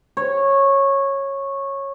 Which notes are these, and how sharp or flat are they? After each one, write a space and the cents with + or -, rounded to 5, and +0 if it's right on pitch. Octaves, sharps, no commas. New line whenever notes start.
C#5 -15